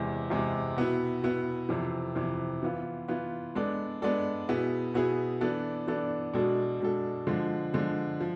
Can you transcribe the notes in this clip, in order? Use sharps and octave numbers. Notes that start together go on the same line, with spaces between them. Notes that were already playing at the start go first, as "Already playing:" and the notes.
Already playing: E2 C3 G#3
E2 C3 G#3
B2 B3 E4
B2 B3 E4
F2 C3 E3
F2 C3 E3
E3 B3 F4
E3 B3 F4
G#3 B3 D4 A4 D5
G#3 B3 D4 A4 D5
B2 B3 E4 G#4
B2 B3 E4 G#4
E3 B3 D4 A4 D5
E3 B3 D4 A4 D5
B2 G#3 D4 A4
B2 G#3 D4 A4
D3 F3 G#3
D3 F3 G#3
F3